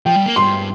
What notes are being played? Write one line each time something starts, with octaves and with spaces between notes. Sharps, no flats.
F3 G5
G3
A#3
G2 C6